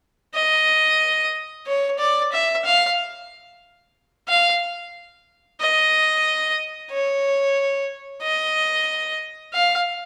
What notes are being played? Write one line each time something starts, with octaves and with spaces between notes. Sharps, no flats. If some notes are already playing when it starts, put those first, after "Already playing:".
D#5
C#5
D5
E5
F5
F5
D#5
C#5
D#5
F5